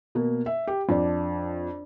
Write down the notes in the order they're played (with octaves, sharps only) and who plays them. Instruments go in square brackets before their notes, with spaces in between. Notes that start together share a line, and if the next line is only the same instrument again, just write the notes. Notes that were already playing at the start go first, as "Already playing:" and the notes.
[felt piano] B2 A#3
E5
G4
[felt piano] F2 [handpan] D4 D5